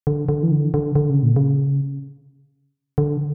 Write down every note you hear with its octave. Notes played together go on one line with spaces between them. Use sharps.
D3
D3
E3
D3
D3
D3
C#3
A#2
C#3
D3